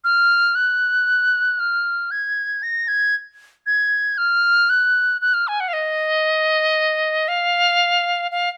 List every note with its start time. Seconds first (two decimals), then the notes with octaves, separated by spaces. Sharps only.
0.04 F6
0.55 F#6
1.59 F6
2.11 G#6
2.63 A#6
2.88 G#6
3.66 G#6
4.18 F6
4.70 F#6
5.21 F#6
5.34 F6
5.48 G#5
5.60 F#5
5.68 F5
5.73 D#5
7.28 F5
8.31 F5